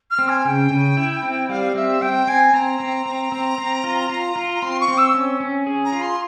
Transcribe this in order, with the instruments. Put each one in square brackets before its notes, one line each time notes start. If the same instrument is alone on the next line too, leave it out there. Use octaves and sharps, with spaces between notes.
[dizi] F6
[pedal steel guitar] C4
[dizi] G#5
[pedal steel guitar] C#3 [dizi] G5
[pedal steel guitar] C#3
E4
C4
[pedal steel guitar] G3 [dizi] F5
[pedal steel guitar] C4 [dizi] E5
[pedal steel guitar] C4 [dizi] G5
[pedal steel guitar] C4 [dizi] G#5
[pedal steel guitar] C4 [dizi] A#5
[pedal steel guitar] C4
C4
C4
C4
F4
F4
F4
[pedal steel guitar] C4 [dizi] C6
[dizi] C#6
[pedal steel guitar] C4
[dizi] E6
[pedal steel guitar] C#4
C#4
G#4
[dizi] A#5
[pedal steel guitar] F4
[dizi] C6